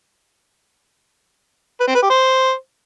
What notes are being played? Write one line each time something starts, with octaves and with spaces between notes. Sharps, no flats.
B4
C4
B4
G4
C5